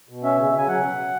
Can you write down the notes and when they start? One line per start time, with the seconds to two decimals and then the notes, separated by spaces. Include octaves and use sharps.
0.09 B2
0.23 C#4 E5
0.38 C#3
0.53 C#3 G#5
0.68 F#3 F#5